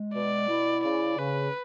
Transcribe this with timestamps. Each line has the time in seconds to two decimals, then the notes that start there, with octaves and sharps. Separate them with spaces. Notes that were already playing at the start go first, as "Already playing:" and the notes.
Already playing: G#3
0.14 B2 D5
0.49 E4
0.84 C#3 D5
1.18 C#3 B4